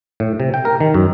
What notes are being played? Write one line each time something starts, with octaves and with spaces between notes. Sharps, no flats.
A2
C3
G5
A#4
D#3
F#2